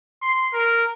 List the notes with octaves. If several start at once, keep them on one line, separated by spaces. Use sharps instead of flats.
C6
A#4